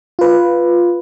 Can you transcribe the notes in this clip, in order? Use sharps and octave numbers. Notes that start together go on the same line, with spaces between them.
F4 B4